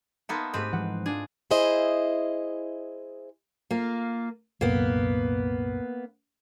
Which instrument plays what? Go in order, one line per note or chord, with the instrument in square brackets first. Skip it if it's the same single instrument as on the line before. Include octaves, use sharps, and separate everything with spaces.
[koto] A#3 B3 D#4 [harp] E5 A5 C6
[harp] G#2 A3 G4 [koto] C4 B4
[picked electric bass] E3 F3 G#3 [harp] F#5
[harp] D4 F4 [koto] G#4
[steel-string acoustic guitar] E4 G#4 C5 D#5
A#3 F4
[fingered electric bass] C2 F#2 A#2 [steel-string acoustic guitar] A#3 B3